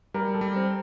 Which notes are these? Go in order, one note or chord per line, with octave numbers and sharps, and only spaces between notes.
G3 A#4
A4
G3
C4